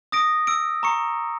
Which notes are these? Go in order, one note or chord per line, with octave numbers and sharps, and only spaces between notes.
D#6 A#6 D7
E6 D7
A#5 C#6 C#7